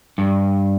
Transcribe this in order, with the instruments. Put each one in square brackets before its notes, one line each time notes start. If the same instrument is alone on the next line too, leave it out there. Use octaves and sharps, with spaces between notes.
[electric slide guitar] G2